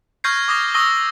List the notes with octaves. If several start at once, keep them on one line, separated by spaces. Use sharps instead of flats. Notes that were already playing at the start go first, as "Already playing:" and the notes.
C#6 F6 G6 G#6 A#6 C7
D6 D#6 F6 A#6 G7
C#6 D#6 E6 A#6 G7